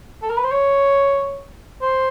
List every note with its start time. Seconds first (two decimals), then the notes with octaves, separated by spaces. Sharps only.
0.22 A4
0.30 A#4
0.37 B4
0.44 C5
0.52 C#5
1.82 C5